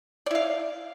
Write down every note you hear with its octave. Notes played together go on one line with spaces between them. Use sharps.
E4 D5 F5